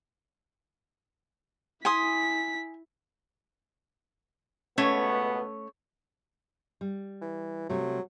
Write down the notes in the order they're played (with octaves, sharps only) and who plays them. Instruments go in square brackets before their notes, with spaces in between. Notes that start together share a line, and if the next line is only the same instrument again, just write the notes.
[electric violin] E4 B6 [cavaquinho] G#5 C6 D#6
[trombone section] C#2 B2 B3 [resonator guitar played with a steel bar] A3 C#4 C#5
[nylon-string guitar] G3
[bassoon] E3
[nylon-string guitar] C3 G3 A3 [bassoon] F#3